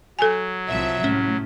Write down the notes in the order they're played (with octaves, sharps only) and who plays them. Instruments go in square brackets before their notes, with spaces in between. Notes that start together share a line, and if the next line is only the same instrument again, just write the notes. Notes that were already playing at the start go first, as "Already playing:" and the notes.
[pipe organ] F#3 [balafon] A4 G#5
[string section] C2 F3 E5
[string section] A2 [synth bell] C#4